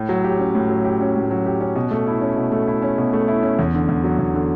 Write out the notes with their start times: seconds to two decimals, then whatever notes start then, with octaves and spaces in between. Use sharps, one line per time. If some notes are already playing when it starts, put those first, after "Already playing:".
Already playing: A2
0.09 F#3
0.24 G4
0.39 C#4
0.55 A2
0.70 F#3
0.85 G4
1.00 C#4
1.16 A2
1.31 F#3
1.46 G4
1.61 C#4
1.76 B2
1.91 A3
2.07 E4
2.21 C#4
2.37 B2
2.52 A3
2.67 E4
2.82 C#4
2.98 B2
3.13 A3
3.28 E4
3.43 C#4
3.59 E2
3.74 D3
3.89 E2
4.04 F#3
4.19 E2
4.34 D3